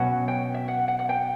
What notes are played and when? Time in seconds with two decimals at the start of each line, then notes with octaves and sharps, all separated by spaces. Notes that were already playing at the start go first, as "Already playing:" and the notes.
Already playing: B2 F#3 C#4 F#4 F#5
0.28 G5
0.54 E5
0.68 F#5
0.88 F#5
0.99 F#5
1.09 G5